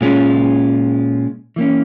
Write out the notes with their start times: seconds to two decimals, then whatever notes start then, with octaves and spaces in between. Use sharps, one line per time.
0.01 A#2 G#3 C#4 F4
1.56 E3 A#3 C#4